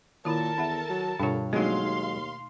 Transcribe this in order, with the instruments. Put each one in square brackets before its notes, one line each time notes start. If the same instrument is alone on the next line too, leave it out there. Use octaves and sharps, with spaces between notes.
[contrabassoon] A#2 [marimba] D#3 E4 B5 [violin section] A4 A#4 A5
[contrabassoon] E2 [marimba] E5 F#5 B5
[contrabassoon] F#3
[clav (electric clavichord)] G2 C#5 [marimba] B2 F4 [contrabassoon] D3
[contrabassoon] G1 [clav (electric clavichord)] F#3 G#3 [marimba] A3 D#4 [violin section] F5 C6
[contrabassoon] D#2